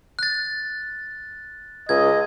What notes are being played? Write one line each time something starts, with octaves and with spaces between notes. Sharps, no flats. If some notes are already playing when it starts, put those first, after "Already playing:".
F#6 A6
C#2 D#5 G#6